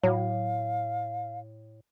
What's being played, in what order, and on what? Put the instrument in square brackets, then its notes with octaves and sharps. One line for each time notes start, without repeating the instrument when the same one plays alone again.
[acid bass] A2 [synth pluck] F#3 [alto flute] F5